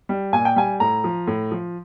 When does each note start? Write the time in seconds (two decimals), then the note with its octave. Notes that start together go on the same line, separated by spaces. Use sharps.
0.09 G3
0.33 A#2 G#5
0.45 G5
0.56 G3 G#5
0.80 A2 A#5
1.04 F3
1.27 A2
1.51 F3